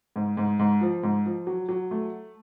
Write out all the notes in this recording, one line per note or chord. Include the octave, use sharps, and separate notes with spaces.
G#2
G#2
G#2
F3
G#2
F3
F#3
F#3
A3